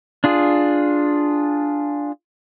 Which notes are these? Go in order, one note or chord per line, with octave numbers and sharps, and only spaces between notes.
D4 F4 G#4